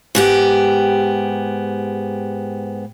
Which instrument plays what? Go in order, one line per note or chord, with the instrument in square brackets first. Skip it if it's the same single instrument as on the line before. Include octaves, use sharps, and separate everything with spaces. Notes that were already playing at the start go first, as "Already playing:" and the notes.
[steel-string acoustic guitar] G#2 B3 G4